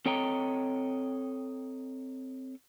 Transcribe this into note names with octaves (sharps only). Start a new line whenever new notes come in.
C4 A4 C#5 D#5 G5 A#5